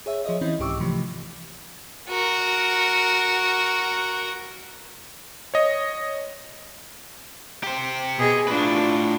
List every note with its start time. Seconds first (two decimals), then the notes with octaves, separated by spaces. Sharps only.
0.06 G#4 C#5 E5
0.24 F3 G#4 C#5 D#5 E5
0.41 E3 C4 C#4 E4 D#5
0.59 C2 G#2 G4 C#6 D6 E6
0.79 C3 E3 F3 A3
2.09 F#4 A#4
5.54 C#5 D#5
7.64 G4 C5
8.18 B2 G#4 D#5
8.48 A2 D4 F4 B4